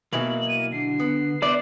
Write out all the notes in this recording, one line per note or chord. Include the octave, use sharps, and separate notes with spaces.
B2 E3 F#3 A#3 E4 F#7
D#7
D3 C7
B3
B3 E4 B4 C5 D5